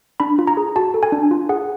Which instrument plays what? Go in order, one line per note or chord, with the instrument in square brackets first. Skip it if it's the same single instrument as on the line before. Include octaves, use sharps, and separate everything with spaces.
[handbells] D4 B5
F4
A#5
G#4
F#4 A5
A4
G#5
D4
F4
G#4 F#5